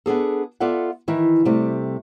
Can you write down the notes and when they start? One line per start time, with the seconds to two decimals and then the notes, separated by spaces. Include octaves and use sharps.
0.06 B3 D4 G#4 A4
0.60 B3 F4 A4 D5 E5 F#5
1.08 D#3 E3 E4
1.45 C3 G3 A3